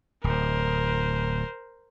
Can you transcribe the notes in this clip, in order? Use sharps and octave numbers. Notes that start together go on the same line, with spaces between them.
D1 A#4 C5